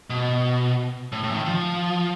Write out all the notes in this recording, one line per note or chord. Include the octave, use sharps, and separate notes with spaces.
B2
A2
A2
E3
D#3
F3